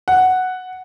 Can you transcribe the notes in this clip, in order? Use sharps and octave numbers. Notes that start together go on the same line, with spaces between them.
F#5